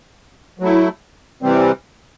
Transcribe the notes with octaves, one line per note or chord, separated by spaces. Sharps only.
F#3 A3 E4
C3 E3 G3 C4